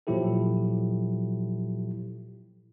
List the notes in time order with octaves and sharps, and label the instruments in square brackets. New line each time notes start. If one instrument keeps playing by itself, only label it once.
[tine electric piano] A#2 F3 F#3 E4 G4 A4